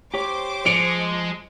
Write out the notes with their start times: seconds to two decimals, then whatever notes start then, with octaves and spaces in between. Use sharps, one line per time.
0.14 G4 C5 C#5 D6
0.66 F3 G#3 C#7 D7 F7